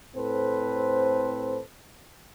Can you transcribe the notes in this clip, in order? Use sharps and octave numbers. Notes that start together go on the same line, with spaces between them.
A2 C4 A4 B4 C5